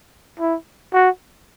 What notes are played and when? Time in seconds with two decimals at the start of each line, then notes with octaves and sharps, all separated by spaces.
0.40 E4
0.94 F#4